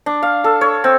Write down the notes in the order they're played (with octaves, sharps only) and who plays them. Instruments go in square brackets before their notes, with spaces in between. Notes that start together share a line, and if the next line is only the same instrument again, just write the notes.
[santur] D4
F5
A4
C#5
C4